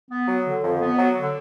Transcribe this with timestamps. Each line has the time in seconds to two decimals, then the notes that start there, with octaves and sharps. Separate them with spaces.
0.09 B3
0.27 F#3
0.45 D3
0.63 F2
0.80 B3
0.98 F#3
1.16 D3